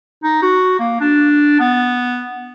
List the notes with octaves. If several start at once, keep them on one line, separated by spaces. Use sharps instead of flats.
D#4
F#4
A#3
D4
B3